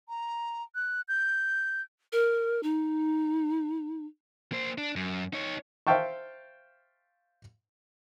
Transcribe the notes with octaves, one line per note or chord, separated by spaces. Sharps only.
A#5
F#6
G6
A#4
D#4
A#3 C5
D4
F#2
D#4 C#5
C5 E5 F5 G5 A5 C#6